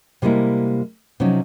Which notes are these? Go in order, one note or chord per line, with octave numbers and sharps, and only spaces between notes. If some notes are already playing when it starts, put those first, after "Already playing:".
C3 G3 G#3 A#3 E4
C3 F3 F#3 C#4 D#4